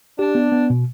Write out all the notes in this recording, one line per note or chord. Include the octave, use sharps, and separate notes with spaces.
D4 G4
B3
B3
B2